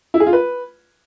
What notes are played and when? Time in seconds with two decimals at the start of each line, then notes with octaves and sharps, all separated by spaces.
0.14 E4
0.20 G#4
0.27 F4
0.33 B4